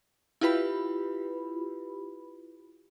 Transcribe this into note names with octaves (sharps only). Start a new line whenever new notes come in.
E4 F4 G4 B4 B5